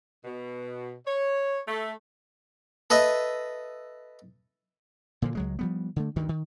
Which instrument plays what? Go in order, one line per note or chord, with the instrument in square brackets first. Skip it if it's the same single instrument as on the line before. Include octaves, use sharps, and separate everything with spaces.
[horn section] B2
C#5
A3
[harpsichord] A4 B4 D#5 E5
[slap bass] A#2 D3 F3
C#2 F#3 G#3
F3 G3 B3
D3 A3
D2 G2 D#3
D#3